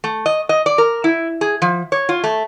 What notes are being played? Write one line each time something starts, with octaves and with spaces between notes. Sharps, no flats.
A3
D#5
D#5
D5
A#4
E4
G#4
F3
C#5
F4
A3